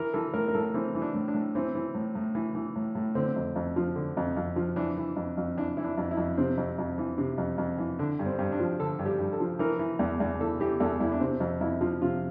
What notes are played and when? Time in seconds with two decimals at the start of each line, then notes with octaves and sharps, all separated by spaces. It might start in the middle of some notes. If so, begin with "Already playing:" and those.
Already playing: E3 A#4
0.13 E3 A4
0.34 A2 A#4
0.48 A#4
0.55 A2 A4
0.74 E3 C4
0.95 E3
1.02 D4
1.14 A2
1.28 D4
1.34 A2
1.55 E3 C4
1.75 E3
1.95 A2
2.15 A2
2.35 E3
2.55 E3
2.76 A2
2.95 A2
3.15 D3 C4
3.36 F2
3.56 F2
3.76 F3
3.96 D3
4.17 F2
4.36 F2
4.56 F3
4.76 E3 D4
4.97 E3
5.16 F2
5.37 F2
5.57 E3 D4
5.77 E3 E4
5.84 D4
5.97 F2
6.11 E4
6.17 F2
6.38 C3 C4
6.57 F2
6.78 F2
6.98 E3
7.18 C3
7.38 F2
7.58 F2
7.78 E3
7.99 D3 D4
8.19 G2
8.26 C4
8.39 G2
8.52 D4
8.60 F3
8.80 D3 A4
8.99 G2
9.06 G4
9.19 G2
9.33 A4
9.40 F3
9.59 E3 A#4
9.79 E3
9.99 E2
10.20 E2
10.41 E3 A4
10.60 E3 G4
10.80 E2 A4
11.00 E2 E4
11.12 D4
11.21 C3 C4
11.40 F2
11.61 F2 E4
11.81 F3
12.02 C3 F4